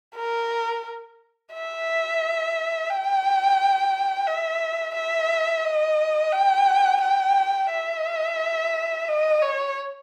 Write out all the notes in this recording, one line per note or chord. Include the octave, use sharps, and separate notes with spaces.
A#4
E5
G5
E5
E5
D#5
G5
G5
E5
D#5
C#5